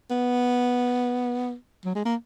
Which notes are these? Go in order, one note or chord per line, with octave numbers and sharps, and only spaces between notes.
B3
F#3
G#3
A#3